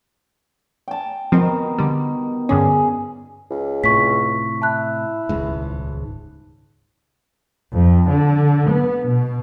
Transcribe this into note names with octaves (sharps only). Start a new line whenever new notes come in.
G5 A5
B2 D#3 F3 C4 A#5
D3 G3
G2 D3 C#4 G#4
C#2
A2 C3 C#6 B6
E4 A5 F#6
D#1 C#2 G#2
F2
D3
B3
B2